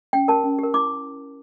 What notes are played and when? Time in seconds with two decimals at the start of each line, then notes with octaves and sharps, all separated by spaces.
0.13 C#4 G5
0.28 G4 A#4 A5
0.44 C#4
0.59 G4 A#4
0.74 E4 D6